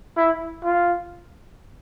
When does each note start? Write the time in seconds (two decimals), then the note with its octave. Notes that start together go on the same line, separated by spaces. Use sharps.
0.17 E4
0.64 F4